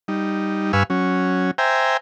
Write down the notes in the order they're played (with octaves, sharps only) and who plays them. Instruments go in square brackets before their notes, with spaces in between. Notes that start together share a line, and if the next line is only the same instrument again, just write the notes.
[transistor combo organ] G3 D#4
G2 B4 F5 G#5 C#6 E6
F#3 C#4
C5 E5 G5 G#5 A#5